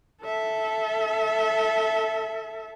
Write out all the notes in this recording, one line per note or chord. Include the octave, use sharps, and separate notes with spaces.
A4 E5